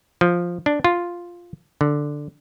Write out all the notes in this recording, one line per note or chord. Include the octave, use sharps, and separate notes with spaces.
F3
D4
F4
D3